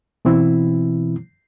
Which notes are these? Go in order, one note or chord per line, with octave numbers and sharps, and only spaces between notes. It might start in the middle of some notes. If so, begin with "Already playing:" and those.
B2 E3 C4 E4